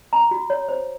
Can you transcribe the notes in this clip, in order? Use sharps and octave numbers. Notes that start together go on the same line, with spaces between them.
A#5
F#4
C#5
C5